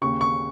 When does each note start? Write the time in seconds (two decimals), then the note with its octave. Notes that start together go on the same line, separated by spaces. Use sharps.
0.01 D#2 C#3 C#6
0.21 C#6